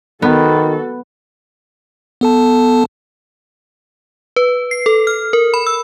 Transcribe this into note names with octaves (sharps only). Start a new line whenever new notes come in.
D#3 B3 F#4 A4
B3 A4 A5
B4
C7
A4
F6
A#4
B5
E6